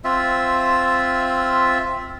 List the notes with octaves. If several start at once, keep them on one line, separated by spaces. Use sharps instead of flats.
C4 F4 E5